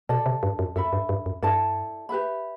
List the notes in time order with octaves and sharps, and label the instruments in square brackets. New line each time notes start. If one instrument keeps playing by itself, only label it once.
[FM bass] B2 [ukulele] A4 D5 A5
[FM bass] C3
G2
F#2
[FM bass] F#2 [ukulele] A4 E5 B5
[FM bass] G2
G2
F#2
[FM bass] G2 [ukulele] E4 A4 D5 A5
[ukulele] G4 B4 E5 B5